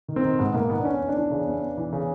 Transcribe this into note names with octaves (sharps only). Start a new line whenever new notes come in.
D#3
C4
D#3
G#2 B3
G#2 A#3
D#3 B3
D4
E2 C#4
E2
D4
E3
C#3
E2
E2
E3
C#3